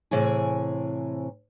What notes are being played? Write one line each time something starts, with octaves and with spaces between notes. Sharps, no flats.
A2 C3 E3 G#4 C#5 G#5